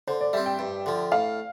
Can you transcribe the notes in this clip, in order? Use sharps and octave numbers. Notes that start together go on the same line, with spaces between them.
D3 C5
D5
G3 C4 E5
G5
G2
D3 F3
A2 F5